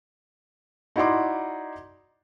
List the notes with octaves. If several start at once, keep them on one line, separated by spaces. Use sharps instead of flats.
D#4 E4 F#4 D5 C6 D6